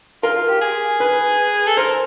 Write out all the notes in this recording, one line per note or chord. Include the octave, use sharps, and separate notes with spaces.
F4 A#4
F4
G4
G#4
B4
A4
A#4 C5